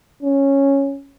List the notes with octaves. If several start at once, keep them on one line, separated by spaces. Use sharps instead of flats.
C#4